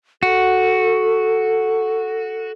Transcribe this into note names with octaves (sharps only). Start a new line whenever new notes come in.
F#4 A4